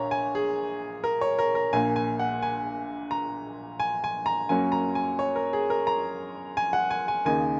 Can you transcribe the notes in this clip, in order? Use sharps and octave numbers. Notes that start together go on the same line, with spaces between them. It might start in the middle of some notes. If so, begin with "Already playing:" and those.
Already playing: A#1 A#2 C#5 A#5
G#5
G#4
A#4
C#5
A#4
A#4
A#1 A#2 A#3 G#5
G#5
F#5
G#5
A#5
G#5
G#5
A#5
F#2 F#3 A#3 C#4 G#5
A#5
G#5
C#5
A#4
G#4
A#4
A#5
G#5
F#5
G#5
G#5
D#2 C#3 A#3 D#4 G#5